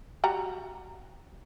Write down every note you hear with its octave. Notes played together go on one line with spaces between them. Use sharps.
G3 F#4 A#5